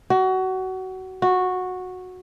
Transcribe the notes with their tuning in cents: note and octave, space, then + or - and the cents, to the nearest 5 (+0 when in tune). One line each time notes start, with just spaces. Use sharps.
F#4 +25
F#4 -10